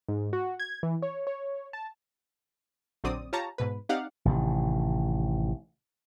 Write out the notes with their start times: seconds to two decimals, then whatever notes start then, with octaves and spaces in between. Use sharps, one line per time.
0.08 G#2
0.33 F#4
0.59 G#6
0.83 E3
1.02 C#5
1.27 C#5
1.73 A5
3.04 A#1 D3 F#3 C4 D5 D#6
3.33 F4 G4 C#5 A5 A#5
3.58 G#2 B2 B4
3.89 C4 D#4 G4 D5 F5 F#5
4.25 A1 C3 D#3